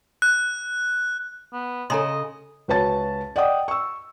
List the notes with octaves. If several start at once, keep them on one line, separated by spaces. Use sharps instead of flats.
F#6
B3
C#3 A4 D#5 A#5 C6
C#2 F#4 B4 C#5 A5 A6
D5 D#5 F#5 G5 D#6
C#6 E6